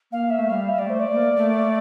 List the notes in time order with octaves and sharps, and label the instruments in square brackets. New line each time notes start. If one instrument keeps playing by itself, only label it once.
[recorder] A#3 [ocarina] F5
[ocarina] E5
[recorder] A3
[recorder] G3 [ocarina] F5
[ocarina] E5
[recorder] G3 [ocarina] D5
[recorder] A3 [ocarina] C5
[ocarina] D5
[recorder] A#3
A3